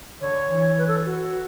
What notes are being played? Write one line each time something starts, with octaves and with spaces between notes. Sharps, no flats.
D3 C#5
E3
B4
A4
F#4